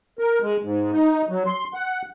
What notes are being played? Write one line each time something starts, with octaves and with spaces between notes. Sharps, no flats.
A#4
G#3
G#2
D#4
F#3
C6
F#5